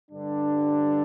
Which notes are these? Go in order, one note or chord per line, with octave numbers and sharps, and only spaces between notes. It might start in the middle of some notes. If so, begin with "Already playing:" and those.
G2 D3 G3 D4